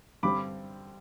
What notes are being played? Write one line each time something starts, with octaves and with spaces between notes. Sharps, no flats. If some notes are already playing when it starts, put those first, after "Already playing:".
G2 D3 G3 C4 B5 D6